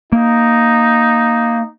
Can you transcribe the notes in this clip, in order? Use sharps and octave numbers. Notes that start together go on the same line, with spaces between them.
A#3 D#4